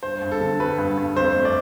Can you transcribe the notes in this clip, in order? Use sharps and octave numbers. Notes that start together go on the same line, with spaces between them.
G2 C5
G2
A4
D3
G3 B4
G2
G2
F2 C5
A3
D5